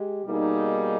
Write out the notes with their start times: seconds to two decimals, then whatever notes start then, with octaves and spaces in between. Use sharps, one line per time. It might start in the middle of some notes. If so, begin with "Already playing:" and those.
Already playing: G#3 G4
0.25 B2 G3 A#3 D#4 G#4